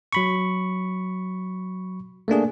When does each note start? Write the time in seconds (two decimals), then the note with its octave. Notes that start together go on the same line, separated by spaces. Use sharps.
0.13 F#3 B5 C#6
2.28 A3 A#3 D4 G#4